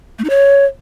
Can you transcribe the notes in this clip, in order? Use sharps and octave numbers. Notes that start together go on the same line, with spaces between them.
A3
D#4
C#5